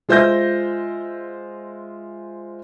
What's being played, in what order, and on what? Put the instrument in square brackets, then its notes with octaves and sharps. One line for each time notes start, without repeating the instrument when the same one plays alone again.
[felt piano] G#3 F4 C5 E5 G6 A#6